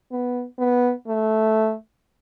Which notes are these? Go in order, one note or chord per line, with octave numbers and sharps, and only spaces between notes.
B3
B3
A3